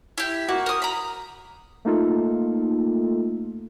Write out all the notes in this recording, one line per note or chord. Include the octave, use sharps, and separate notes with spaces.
E4 G4
A#3 F#4
A#4 D#6
A#5 B5
A3 A#3 D#4 F4 A4